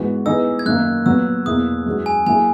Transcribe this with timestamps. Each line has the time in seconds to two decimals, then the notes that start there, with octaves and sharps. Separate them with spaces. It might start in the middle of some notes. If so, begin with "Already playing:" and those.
Already playing: G#2 E3 G#3 B3 F#4
0.26 E3 B3 D#4 G#4 E6
0.59 G#6
0.66 F#2 D#3 A#3 F#6
1.06 A#2 F#3 B3 E6
1.46 E2 B2 A#3 E4 D#6
1.86 F#2 E3 G#3 C#4 F#4
2.06 G#5
2.27 F#3 A#3 E4 G#4 G#5